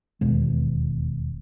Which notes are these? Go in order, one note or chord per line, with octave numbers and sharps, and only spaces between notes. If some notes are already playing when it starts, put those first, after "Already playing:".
E1 D#2 B2 G#3